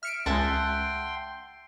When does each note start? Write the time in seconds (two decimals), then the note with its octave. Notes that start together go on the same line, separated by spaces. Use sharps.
0.03 E5 F6 C#7 D7
0.26 C#2 G#3 E5 F#5 G5 A5 C6